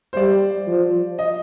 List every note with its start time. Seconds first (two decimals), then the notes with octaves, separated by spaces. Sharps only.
0.13 C5
0.17 G3 D5
0.67 F3
1.19 D#5